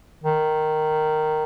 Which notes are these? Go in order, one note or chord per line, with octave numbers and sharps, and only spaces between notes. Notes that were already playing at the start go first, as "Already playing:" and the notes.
D#3